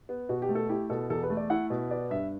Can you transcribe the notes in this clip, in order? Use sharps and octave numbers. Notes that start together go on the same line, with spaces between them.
B3
B2 F#4
G4
A3
A4
E4 G4
B2 A4
E2 A4
B4
A3
D5
E4 F#5
B2
B3 D5
G2 E5